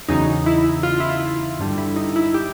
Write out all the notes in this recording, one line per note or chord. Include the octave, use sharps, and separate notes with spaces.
E2 C#3 F#3 D#4
E4
F4
E4
F4
G2 D3 G3
E4
D#4
E4
G4